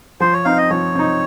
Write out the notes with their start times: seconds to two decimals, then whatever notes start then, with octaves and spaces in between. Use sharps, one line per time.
0.20 F3 C5
0.33 C#5
0.45 C4 D#4 F5
0.58 D#5
0.70 F3 C#5
0.95 C4 D#4